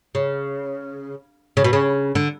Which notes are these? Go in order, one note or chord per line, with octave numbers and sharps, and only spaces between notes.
C#3
C#3
B2
C#3
D3